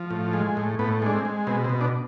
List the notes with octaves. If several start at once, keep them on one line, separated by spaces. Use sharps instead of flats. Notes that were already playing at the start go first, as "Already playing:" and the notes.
Already playing: F3
A2
G#3
A2
A2 B3
G#3 D4
C4
G#3
B2 C4
C4
B2
D4